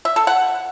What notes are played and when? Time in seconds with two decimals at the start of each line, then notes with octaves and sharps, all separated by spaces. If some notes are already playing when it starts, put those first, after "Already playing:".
0.05 E5
0.16 A4
0.27 F#5